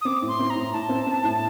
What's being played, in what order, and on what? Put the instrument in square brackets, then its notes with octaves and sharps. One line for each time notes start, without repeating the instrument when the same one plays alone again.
[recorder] D#6
[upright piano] C4 [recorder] D6
[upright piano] A2
[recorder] C6
[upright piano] C4
[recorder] A#5
[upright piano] A2
[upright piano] A2 [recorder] A5
[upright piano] C4
C4
A2